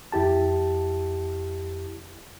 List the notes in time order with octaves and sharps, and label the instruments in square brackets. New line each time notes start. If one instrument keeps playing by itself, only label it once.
[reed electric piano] F2 E4 G4 A5